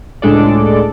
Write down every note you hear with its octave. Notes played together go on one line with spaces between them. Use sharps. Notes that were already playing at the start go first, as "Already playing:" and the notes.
C#2 A2 G#3 D4 A4 D5